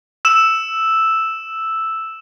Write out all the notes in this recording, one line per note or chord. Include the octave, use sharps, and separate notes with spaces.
E6 E7